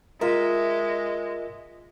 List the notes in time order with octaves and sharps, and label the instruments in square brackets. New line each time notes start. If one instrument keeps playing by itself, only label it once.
[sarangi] G#3 [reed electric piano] F4 A#4 [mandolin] E5